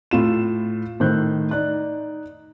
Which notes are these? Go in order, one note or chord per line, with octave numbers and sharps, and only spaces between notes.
A2 F4 E7
A2 D#3 C5 F#6 G6
D#4 D5 F#6